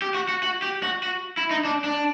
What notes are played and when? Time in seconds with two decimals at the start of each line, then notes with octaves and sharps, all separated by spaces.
0.02 G4
0.15 F#4
0.29 F#4
0.43 F#4
0.62 G4
0.83 F#4
1.03 F#4
1.37 E4
1.51 D#4
1.65 D4
1.84 D4